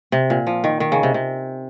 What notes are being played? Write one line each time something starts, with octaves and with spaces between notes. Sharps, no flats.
C3
A#2
F3
D#3
D#3
C#3
C3
C3